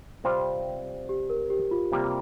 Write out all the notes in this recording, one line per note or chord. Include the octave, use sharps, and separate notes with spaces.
C3 G3 C4 F4 C5
G4
A#4
G4
F4
C3 G3 A#3